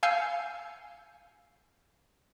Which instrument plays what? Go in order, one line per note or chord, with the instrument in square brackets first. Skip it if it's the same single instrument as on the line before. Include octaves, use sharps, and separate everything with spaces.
[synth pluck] F5 G#5 E6 G6 C7 C#7